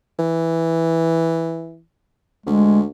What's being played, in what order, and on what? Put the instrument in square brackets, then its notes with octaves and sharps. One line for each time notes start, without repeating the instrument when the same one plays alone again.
[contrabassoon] E3
[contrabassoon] D2 [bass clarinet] G#3